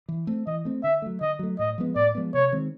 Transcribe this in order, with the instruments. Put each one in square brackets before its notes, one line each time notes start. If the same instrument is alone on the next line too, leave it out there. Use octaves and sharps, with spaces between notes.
[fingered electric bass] E3
A3 C4
[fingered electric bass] E3 [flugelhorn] D#5
[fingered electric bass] A3 C4
[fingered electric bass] D3 [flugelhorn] E5
[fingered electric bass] F#3 A3
[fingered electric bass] D3 [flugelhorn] D#5
[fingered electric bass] F#3 A3
[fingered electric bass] A2 [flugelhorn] D#5
[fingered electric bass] F3 G#3 B3
[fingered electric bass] A2 [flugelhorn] D5
[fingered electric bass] F3 G#3 B3
[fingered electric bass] C3 [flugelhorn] C#5
[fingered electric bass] D#3 G#3 C4